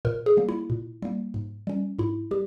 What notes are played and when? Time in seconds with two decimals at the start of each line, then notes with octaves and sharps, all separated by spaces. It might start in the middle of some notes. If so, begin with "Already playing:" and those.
0.05 A#2 A#4
0.26 G#4
0.37 G3 A#3
0.49 E4
0.70 A#2
1.02 G3 A#3
1.34 G#2
1.67 G3 C#4
1.99 G#2 E4
2.31 G3 G4